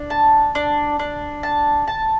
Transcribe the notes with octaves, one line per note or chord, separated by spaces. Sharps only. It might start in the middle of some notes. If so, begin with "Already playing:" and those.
Already playing: D4
A5
D4
D4
A5
A5